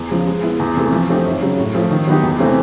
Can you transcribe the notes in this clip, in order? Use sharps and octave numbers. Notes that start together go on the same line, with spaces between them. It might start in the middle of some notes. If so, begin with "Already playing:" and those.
Already playing: E2
C#3 F3
G#3
B3 E4
E2
C3 E3 A3
F3
A3 C4 D#4 G4
F#2
C#3 F#3
A2
F3 A3
D#3
F#3 B3 D#4 G4
E2
C3 E3 A3 C4